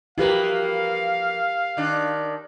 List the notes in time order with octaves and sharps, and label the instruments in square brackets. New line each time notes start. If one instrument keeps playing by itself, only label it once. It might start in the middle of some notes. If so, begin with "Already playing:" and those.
[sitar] F3 A#3 B4 [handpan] E4 G4 A#4 [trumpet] F5
[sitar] D#3 D4